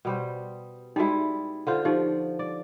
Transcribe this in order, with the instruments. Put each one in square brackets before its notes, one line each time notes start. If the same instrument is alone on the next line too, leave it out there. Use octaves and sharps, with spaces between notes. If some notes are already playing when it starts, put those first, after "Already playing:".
[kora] B2 G3 C5
[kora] G3 G#3 E4 [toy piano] D#4 F#4
[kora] D3 F4 C5
[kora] F3 [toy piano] D#4 G4 C5
[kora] D5